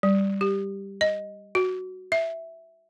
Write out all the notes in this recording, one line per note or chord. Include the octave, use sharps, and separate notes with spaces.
G3
G4
D#5
F#4
E5